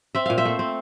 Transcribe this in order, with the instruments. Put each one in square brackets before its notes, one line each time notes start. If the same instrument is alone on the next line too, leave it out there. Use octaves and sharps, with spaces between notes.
[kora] C4 E5
A#2 F5
C5 E5
A3
C4